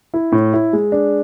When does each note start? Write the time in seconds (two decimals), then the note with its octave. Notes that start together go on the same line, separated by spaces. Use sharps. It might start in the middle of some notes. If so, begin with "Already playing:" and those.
0.14 E4
0.32 A2
0.53 E4
0.73 G#3
0.92 D4